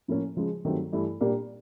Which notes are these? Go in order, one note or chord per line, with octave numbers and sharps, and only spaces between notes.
A2 F3 A#3 C#4
C#3 F3 G#3
G2 D#3 F#3 A3 C4
G2 E3 A3
A#2 G3 A#3 D4 G4